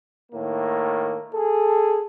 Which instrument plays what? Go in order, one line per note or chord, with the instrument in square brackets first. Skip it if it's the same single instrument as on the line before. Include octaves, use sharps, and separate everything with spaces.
[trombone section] A2 D#3 A#3
[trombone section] G#4 [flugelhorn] A4